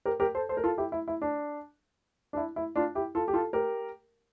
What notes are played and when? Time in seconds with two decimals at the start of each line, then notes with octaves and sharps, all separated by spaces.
0.06 G4 A#4
0.20 G4 A#4
0.35 A4 C5
0.49 A4 C5
0.57 A#4
0.64 F4 A4
0.78 E4 G4
0.92 E4
1.08 E4
1.22 D4
2.33 D4
2.37 E4
2.56 E4
2.76 D4 F4
2.95 E4 G4
3.15 F4 A4
3.28 G4
3.34 F4 A4
3.53 G4 A#4